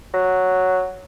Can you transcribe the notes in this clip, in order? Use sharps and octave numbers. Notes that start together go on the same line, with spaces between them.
F#3